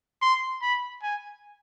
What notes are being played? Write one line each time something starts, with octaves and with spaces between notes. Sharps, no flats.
C6
B5
G#5